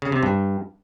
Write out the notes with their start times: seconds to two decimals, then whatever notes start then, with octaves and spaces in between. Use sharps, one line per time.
0.02 C#3
0.12 C3
0.23 G2